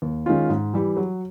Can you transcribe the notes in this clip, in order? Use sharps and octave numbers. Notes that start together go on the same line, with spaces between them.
D#2
D#3 G#3 C#4 F4
G#2
E3 G3
F#3